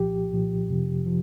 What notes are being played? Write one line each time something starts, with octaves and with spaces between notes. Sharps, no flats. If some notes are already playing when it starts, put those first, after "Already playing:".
Already playing: C2 A#2 F3 G4
C2 A#2 F3
F2 C3 F3
F3